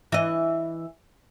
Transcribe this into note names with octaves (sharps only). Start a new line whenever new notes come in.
E3 D#5